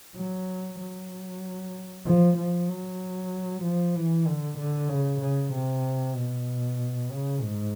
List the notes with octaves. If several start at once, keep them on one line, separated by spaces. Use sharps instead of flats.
F#3
F#3
F3
F3
F#3
F3
E3
D3
D3
C#3
C#3
C3
B2
C#3
G#2